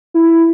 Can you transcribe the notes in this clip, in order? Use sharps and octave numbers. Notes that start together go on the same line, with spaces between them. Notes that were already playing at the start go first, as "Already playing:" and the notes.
E4